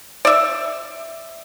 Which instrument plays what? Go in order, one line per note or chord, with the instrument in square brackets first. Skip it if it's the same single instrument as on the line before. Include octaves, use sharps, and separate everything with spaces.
[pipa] D5 E5